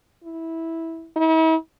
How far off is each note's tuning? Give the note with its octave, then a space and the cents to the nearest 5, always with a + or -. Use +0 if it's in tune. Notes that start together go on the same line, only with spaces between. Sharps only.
E4 -10
E4 -45